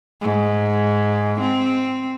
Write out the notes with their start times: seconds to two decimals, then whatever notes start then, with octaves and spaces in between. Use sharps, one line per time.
0.22 G#2
1.40 C4